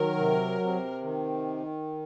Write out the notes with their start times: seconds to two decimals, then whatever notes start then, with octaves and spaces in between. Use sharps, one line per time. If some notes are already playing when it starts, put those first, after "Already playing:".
Already playing: D#3 F#3 A#4
0.17 C3
0.61 C3
1.03 D#3